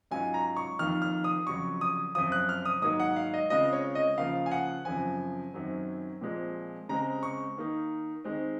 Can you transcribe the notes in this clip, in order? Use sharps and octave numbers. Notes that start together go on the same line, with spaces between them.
G#2 F#3 C#4 F4 G#5
A#5
C#6
F2 D#3 A#3 F4 F6
F6
D#6
F2 C#3 F#3 C#6
D#6
F#2 F3 C4 F4 D#6
F#6
F6
D#6
G#2 D#3 F#3 A#3 D#6
F#5
F5
D#5
C#3 G#3 C4 F4 D#5
C#5
D#5
C#3 F3 A#3 F4 F5
G#5
F#5
F#2 C#3 F3 C4 G#5
F#2 D#3 F#3 C4
A#2 F3 G#3 C4
C#3 G#3 C4 A#5
C#6
D#3 A#3 D#4
D#3 G#3 C4